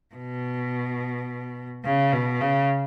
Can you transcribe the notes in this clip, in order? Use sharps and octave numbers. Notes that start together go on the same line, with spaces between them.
B2
C#3
B2
C#3